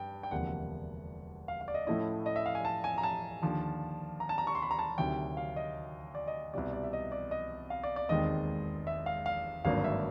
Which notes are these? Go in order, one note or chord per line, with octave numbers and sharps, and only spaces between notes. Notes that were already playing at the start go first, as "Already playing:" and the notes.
Already playing: G2 G5
G5
E1 D2 C3 F3 A#3 F#5
F5
F5
D5
D#5
A2 F3 A3 C#4 E4 D#5
D#5
E5
F5
G#5
A5
G#5
A#5
A5
D#2 D3 F3
A#5
A5
A#5
C#6
C6
B5
A#5
A5
D2 C3 D#3 F#3 G5
F5
D#5
D5
D#5
C2 B2 G3 D5
D5
E5
D#5
D5
D#5
F5
D5
D5
E1 D#2 D#3 G#3 C4 D#5
E5
F5
F5
G#1 G2 D3 F#3 A#3 F5
E5